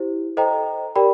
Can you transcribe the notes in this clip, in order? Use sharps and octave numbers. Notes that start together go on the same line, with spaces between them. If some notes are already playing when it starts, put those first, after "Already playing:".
Already playing: E4 G4 C5
A4 C5 D#5 G5 A#5
G4 A#4 D5 G5 B5